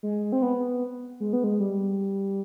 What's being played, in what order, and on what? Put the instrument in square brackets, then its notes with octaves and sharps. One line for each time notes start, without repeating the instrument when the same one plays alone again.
[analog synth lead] G#3
C4
B3
G#3
B3
G#3
G3